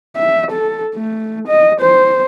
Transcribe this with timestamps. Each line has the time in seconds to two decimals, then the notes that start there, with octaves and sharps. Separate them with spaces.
0.16 E5
0.51 A4
0.95 A3
1.48 D#5
1.81 C5